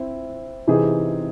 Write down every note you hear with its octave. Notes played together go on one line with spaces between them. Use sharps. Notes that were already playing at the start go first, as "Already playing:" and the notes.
Already playing: C4 E4 C5 E5
C3 E3 C4 D#4 G#4